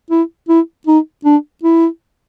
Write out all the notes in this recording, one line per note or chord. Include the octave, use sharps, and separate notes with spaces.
E4
E4
D#4
D4
E4